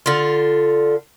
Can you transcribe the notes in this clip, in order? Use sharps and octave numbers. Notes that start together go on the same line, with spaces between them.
D3 F4